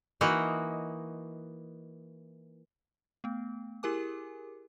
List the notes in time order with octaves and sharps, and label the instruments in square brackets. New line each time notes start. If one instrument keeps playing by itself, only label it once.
[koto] E3 A#3 D#4 E4 F#4 D#5
[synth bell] A3 B3
E4 G4 G#4 A#4 G#5 D6